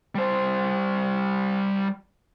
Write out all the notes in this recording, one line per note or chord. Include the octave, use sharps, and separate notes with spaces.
G3 C5